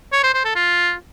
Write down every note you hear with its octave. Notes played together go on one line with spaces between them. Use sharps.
C#5
C5
C5
A4
F4